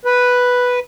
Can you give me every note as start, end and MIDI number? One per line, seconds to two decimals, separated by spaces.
0.05 0.80 71